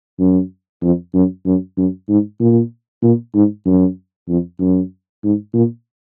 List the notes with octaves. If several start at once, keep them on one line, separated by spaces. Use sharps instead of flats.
F#2
F2
F#2
F#2
F#2
G#2
A#2
A#2
G#2
F#2
F2
F#2
G#2
A#2